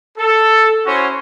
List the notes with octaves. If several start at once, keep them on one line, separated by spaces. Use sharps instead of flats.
A4
C#4 E4 F#4 C5 C#5